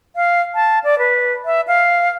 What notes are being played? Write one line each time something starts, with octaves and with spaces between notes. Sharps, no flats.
F5
A5
D5
B4
E5
F5